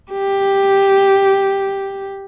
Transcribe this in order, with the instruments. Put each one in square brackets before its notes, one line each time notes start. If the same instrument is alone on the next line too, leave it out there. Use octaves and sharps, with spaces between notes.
[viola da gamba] G4